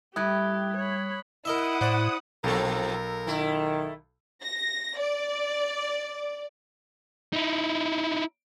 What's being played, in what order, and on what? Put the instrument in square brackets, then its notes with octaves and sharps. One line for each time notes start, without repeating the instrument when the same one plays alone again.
[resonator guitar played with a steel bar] A2 E4 [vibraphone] G3 [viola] G4 [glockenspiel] D#6 F#6 G#6
[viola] C#5 B5
[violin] E4 [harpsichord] A#4 D#5 E5 [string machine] F#5 D#6
[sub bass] A2 [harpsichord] C5 D5
[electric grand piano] B1 A4 [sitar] B2 F3 [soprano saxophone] A#4
[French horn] D#3 [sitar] A3 E4
[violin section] A#6
D5
[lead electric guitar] D#4 E4